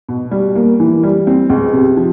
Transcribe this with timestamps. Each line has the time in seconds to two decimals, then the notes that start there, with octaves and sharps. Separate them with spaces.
0.09 B2
0.31 G3
0.55 A#3
0.80 E3
1.03 G3
1.27 C4
1.49 C#2
1.73 C3
1.97 F3